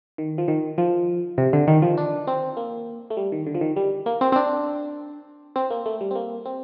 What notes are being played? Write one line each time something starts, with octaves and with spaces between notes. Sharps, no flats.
D#3
F3
D#3
F3
C3
D3
D#3
F3
D4
C4
A#3
A3
G3
D#3
D3
F3
D#3
G3
A#3
C4
C4
D4
C4
A#3
A3
G3
C4
A#3
C4